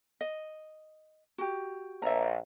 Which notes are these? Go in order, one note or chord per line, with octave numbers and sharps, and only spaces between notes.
D#5
F#4 G4
A#1 E5 A#5